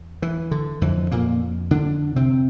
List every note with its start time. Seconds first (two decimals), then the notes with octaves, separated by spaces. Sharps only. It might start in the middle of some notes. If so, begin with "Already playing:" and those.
Already playing: E2
0.22 E3
0.51 D3
0.81 F2 D3 E3
1.11 A#2 A#3
1.71 D3 D4
2.16 C3 C4